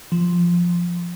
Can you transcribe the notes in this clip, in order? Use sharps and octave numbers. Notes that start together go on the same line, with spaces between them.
F3